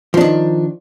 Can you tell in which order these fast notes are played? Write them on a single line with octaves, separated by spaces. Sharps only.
F3 D4 D#3